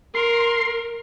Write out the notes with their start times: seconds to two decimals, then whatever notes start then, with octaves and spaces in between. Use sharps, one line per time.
0.15 A#4 C6